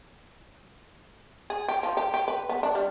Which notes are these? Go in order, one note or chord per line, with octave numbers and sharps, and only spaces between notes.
G#4
G4
F3
G4
G4
B4
B3
D4
G3